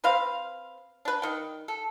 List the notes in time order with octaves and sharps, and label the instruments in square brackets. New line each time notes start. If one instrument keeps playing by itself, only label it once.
[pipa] C4 B4 C5 F5
D4 B4
D#3 G5
A4